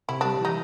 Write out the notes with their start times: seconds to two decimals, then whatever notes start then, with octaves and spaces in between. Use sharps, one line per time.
0.09 C3 E4
0.21 D4
0.25 G3
0.41 E3 D#4